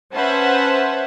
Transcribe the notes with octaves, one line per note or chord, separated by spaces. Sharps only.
C#4 B4 C5 E5 F#5 A5